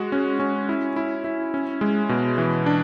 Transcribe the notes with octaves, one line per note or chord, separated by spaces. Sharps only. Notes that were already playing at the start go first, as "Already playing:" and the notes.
Already playing: G#3 F#4
C#4
C#4
E4
E4
E4
C#4
G#3
B2
E3
D4